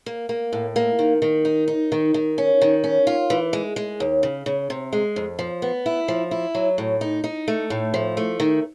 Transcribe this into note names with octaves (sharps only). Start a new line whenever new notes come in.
A#3
A#3
A2
A#3
D#3
D#3
D#4
D#4
D#3
D#3
C#4
D#3
C#4
F4
E3
G#3
G#3
D#2
C#3
C#3
C3
G#3
F2
F3
B3
E4
F3
E4
F#3
A2
D#4
D#4
A3
A2
F3
A3
D#3